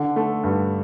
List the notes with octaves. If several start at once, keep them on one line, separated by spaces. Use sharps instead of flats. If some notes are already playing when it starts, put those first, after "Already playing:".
Already playing: D3
A3
G2